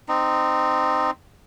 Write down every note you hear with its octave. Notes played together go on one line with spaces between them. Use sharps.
C4 D#4